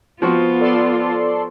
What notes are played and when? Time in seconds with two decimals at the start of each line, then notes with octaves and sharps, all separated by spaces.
0.22 F3 B3 C4 F4 F#4
0.60 A4 D5 C6